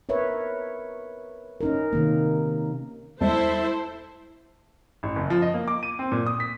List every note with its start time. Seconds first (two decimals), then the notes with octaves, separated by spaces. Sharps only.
0.09 A#4 B4 C#5 E5
1.61 C#4 D#4 A#4
1.93 C3 D#3 A#3
3.21 E2 G3 G#3 E4 A4 C5 E5 A5
5.03 A1
5.16 F#1
5.30 F3
5.42 D#5
5.54 A#3
5.68 D6
5.83 D#7
5.99 C4
6.12 A#2
6.26 D#6
6.40 B6